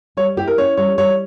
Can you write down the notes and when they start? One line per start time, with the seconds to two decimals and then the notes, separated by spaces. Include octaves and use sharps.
0.17 G3 C#5
0.37 E4 G4
0.47 A#4
0.58 C#4 C#5
0.77 G3 C#5
0.98 G3 C#5